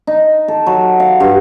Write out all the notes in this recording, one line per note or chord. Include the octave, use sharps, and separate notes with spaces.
D#4
A4
F#3
F5
G2